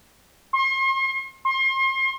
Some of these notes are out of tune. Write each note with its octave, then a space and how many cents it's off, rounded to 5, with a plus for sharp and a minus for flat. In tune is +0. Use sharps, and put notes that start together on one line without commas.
C6 +40
C6 +35